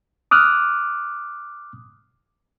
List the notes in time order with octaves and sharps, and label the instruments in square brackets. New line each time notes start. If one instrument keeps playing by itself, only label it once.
[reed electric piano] D6 D#6 F6 F#6